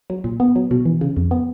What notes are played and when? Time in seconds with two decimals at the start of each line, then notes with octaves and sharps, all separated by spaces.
0.10 F#3
0.24 A#2
0.40 B3
0.56 F#3
0.71 B2
0.85 E3
1.01 C#3
1.16 F2
1.31 B3